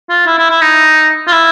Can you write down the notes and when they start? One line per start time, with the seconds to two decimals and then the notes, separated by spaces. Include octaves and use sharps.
0.09 F4
0.26 E4
0.38 E4
0.50 E4
0.61 D#4
1.27 F4
1.32 E4